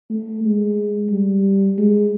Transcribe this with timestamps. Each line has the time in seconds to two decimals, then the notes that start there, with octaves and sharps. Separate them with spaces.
0.10 A3
0.44 G#3
1.10 G3
1.78 G#3